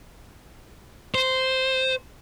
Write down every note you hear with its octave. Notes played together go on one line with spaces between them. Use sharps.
C5